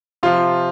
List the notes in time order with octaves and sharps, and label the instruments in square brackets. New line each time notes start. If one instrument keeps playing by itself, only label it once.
[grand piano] C3 F3 F4